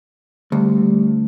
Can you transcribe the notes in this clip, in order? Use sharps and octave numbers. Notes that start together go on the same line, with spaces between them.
D2 G3